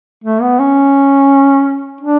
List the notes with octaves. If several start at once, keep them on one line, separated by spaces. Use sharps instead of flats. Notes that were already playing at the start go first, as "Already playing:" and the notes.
A3
B3
C#4
D4